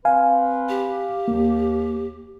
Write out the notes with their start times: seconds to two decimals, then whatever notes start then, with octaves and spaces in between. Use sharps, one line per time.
0.05 C4 B4 F5 G#5
0.69 G4
1.28 D#2 A#3